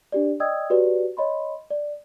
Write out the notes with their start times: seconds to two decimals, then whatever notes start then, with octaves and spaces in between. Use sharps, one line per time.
0.12 D4 G4 D5
0.40 D5 D#5 G5 D#6 E6 G#6
0.70 F#4 G4 B4 C#5 D5
1.17 C#5 D#5 B5 C6
1.71 D5